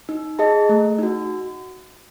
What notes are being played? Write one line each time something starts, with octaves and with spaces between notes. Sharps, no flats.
D#4
G#4 D#5 A5
A3
D#4 F#4